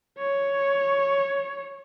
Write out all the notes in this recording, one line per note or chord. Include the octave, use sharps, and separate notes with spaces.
C#5